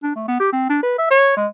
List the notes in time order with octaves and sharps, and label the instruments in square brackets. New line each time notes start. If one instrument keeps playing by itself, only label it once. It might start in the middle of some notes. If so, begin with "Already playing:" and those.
[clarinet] D4
A3
B3
G4
C4
D4
B4
E5
C#5
G#3